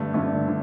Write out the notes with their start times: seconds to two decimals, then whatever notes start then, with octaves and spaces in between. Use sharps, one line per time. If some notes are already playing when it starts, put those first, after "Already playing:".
Already playing: G2 D3 A3
0.14 G2 D3 A3
0.48 D3